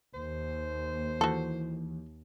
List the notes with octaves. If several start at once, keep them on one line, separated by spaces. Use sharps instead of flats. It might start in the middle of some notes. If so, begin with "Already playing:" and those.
D#2 C5
E3 F#4 A4